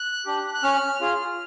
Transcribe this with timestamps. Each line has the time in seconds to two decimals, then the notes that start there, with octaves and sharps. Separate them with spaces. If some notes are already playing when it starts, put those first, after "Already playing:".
Already playing: F#6
0.26 D4 G4
0.54 F#6
0.63 C#4 F6
1.01 F4 G#4